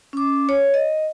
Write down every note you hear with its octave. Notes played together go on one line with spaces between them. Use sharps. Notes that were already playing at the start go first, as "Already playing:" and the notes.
C#4 D6
C#5
D#5